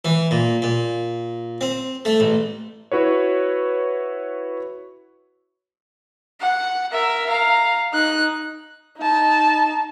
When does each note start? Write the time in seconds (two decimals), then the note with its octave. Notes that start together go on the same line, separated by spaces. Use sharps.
0.05 E3
0.31 A#2
0.62 A#2
1.61 C4
2.05 A3
2.20 A1
2.92 E4 F#4 B4 C#5
6.40 F#5
6.92 A#4 E5
7.29 F5 A#5
7.93 D#4 F#6
8.98 D#4 A5